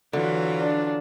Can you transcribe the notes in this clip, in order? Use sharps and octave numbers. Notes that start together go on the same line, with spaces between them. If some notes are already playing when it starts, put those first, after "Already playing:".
D3 E3 F#3 F4
D4